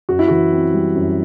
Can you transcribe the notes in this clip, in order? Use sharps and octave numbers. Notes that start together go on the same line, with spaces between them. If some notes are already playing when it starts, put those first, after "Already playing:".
F#2 F#4
E4
E3 F#4
C4
G3
F#2